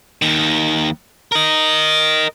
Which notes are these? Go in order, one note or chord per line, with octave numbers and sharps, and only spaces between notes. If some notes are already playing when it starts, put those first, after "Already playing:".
D#2 D#3
A#4 D#5